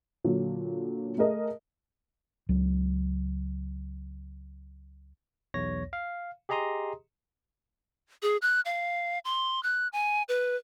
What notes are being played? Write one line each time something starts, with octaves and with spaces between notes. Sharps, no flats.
A#2 D3 F#3
A3 G#4 A#4 D#5
C#2 F#3
B1 E2 C#5 A#6
F5
G4 G#4 D#5 A#5 C6 D#6
G#4
F#6
F5
C6
F#6
G#5
B4